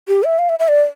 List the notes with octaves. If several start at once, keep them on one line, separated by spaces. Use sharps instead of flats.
G4
E5
F5
E5
E5
D5